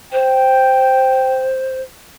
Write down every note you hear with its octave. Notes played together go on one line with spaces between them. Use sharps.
C5 G5